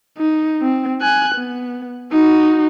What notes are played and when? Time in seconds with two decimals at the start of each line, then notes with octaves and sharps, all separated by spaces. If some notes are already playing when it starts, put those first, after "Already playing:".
0.18 D#4
0.62 C4
1.02 G#5 F#6
1.35 B3
2.13 D#4 F#4